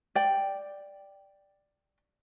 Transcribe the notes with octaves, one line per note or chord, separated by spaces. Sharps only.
D5 G5